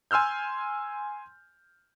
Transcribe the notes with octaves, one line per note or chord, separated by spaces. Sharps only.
G#5 C6 E6 F6 G6